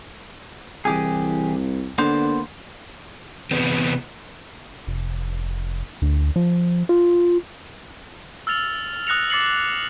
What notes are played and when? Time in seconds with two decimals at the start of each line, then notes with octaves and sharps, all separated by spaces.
0.85 C2 E3 G4 G#4
1.98 D3 A#3 B3 C5
3.51 C3 E3 B3 C4
4.87 F1
6.02 D2
6.36 F3
6.89 F4
8.47 E6 F6 A6 F7
9.07 D#6 F#6 A#6 C#7 F7
9.30 D6 A6 C7 C#7 F#7